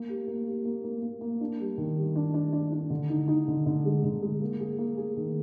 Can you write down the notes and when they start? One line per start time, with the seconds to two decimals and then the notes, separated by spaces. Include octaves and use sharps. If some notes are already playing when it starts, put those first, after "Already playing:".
Already playing: A#3
0.09 G4
0.27 A#3
0.47 G4
0.65 A#3
0.84 A#3
1.02 A#3
1.21 A#3
1.40 D4
1.60 G3
1.78 D#3
1.97 G3
2.16 D4
2.34 D4
2.53 D4
2.72 D4
2.90 D3
3.09 D#4
3.28 D#4
3.48 D3
3.66 D3
3.85 G#3
4.04 D3
4.22 G#3
4.42 A#3
4.60 G#4
4.78 A#3
4.97 G#4
5.17 D#3